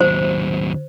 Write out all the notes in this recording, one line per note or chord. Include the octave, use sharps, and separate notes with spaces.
D#2 F#3 C5